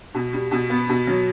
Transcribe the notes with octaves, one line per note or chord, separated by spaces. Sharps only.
B2
G3
B2
B3
B2
F#3